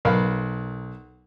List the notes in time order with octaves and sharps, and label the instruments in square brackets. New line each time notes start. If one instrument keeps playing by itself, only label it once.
[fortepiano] B1 A#4 F5 B5